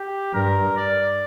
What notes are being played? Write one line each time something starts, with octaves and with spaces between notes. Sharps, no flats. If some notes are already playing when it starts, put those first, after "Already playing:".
Already playing: G4
G2 A#4
D5